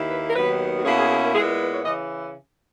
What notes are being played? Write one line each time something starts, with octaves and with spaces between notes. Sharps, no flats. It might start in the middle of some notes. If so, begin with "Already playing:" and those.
Already playing: D#2 D#3 A#3 E4
B4
A#4
D#2 D#3 F#3 B3 B4
F#4
B2 A#3 C#4 E4 G#4
G#4
G#4
A#4
A#2 G#3 B3 E4 G#4
A#4
B4
C#5
C#3 E3 D#5